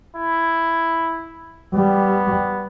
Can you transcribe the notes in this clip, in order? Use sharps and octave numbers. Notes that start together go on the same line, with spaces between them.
E4
G3 B3